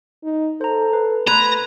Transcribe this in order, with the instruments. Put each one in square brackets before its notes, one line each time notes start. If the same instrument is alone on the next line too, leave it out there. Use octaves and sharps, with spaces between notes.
[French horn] D#4
[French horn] A4 [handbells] C5 A#5
[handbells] B4
[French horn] A3 [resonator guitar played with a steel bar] B4 [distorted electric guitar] A#5 [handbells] C6 F#6 G#6